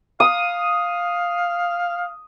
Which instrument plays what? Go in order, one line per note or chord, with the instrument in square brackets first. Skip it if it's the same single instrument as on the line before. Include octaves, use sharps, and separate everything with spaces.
[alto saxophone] F5 [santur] D#6